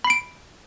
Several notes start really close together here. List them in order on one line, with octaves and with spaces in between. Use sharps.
B5 C7 D7